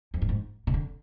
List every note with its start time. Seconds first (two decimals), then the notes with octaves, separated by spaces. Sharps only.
0.14 F2
0.22 G2
0.29 G#2
0.67 C3
0.74 D3